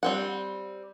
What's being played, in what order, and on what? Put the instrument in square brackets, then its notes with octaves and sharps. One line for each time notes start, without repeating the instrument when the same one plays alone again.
[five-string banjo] G3 C4 F#5